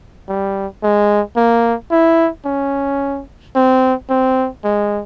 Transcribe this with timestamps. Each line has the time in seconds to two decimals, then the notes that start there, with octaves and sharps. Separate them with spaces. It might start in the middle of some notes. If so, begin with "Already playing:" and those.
0.29 G3
0.83 G#3
1.36 A#3
1.92 E4
2.45 C#4
3.56 C4
4.10 C4
4.64 G#3